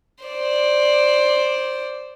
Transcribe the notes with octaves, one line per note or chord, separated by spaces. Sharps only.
C5 D5